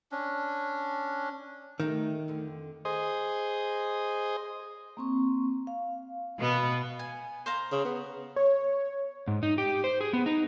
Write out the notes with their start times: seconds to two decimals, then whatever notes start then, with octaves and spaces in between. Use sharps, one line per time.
0.12 C#4 D4
1.80 D#3 A3 A#3 G4
2.28 F2 D3
2.85 G#4 C5 D#5
4.97 A#3 C4 C#6
5.67 F5
6.39 B2 B3
6.99 G#5
7.46 C5 F5 A#5
7.72 C#3
7.85 B3
8.36 C#5
9.27 G#2
9.43 D#4
9.58 G4
9.84 C5
10.01 G#4
10.13 B3
10.26 D#4